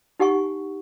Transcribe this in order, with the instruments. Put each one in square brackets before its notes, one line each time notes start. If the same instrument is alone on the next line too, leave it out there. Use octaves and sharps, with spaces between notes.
[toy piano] D#4 G4 F#5 G#5 C#6